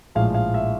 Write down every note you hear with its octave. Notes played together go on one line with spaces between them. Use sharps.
A#1 A2 F3 G#3 F5
F5
E5